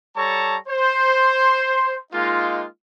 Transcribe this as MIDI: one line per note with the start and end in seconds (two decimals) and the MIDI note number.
0.16 0.57 55
0.16 0.57 69
0.16 0.57 73
0.16 0.57 81
0.16 0.57 82
0.16 0.57 85
0.69 1.98 72
0.69 1.98 84
2.13 2.66 56
2.13 2.66 58
2.13 2.66 63
2.13 2.66 65